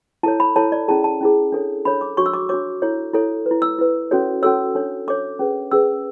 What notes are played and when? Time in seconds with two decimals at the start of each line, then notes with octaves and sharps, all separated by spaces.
0.23 E4 A4 C#5 A5
0.40 B5
0.56 E4 A4 C#5 A5
0.72 D5
0.88 C#4 E4 G#4 A5
1.04 A5
1.21 C#4 E4 G#4
1.52 D4 A4 C#5
1.85 D4 A4 C#5 B5
2.01 D6
2.17 D4 F#4 C#5 C#6
2.26 E6
2.33 D6
2.49 D4 F#4 C#5 D6
2.82 E4 A4 C#5
3.13 E4 A4 C#5
3.46 B4
3.51 E4
3.62 E6
3.78 E4 B4
4.11 C#4 F#4 A4 C#5
4.42 C#4 F#4 A4 C#5 E6
4.75 D4 A4 C#5
5.07 D4 A4 C#5 D6
5.39 C#4 G#4 B4
5.71 C#4 G#4 B4 E6